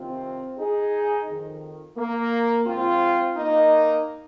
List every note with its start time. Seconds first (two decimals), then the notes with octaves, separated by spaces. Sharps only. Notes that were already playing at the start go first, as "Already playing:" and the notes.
Already playing: C2 C3 D#3 C4 F4
0.58 D#4 G#4
1.27 F2 D#3
1.96 A#3
2.66 G#2 F3 C4 F4
3.35 A#3 D#4